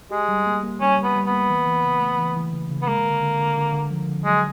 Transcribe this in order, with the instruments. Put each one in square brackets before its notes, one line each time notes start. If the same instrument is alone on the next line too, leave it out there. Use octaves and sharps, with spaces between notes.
[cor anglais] G#3 [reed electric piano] G4
[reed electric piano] G3
A#3
A#3
[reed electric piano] G3 [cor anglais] C#4
[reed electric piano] G3
[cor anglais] B3
[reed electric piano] G3
[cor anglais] B3
[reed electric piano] A#3
E3
E3
C#3
A3
E3
E3
C#3
C#3
[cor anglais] B3
[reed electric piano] G#3 [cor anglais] A#3
[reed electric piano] D3
D3
D3
D3
D3
F3
D3
[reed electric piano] F#3 [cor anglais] G#3